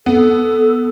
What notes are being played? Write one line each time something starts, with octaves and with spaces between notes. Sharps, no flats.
B3 A4